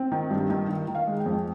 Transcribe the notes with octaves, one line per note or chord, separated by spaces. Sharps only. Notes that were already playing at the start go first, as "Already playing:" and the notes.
Already playing: C4
D#3
G2
D#3
D#3
D#3
F5
G#3
G5
F2